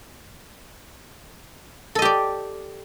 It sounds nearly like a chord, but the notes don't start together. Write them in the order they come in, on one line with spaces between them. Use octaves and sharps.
A4 D#5 G4 D5